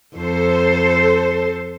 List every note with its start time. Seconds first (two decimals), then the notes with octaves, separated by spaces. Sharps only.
0.17 F2 A4 C5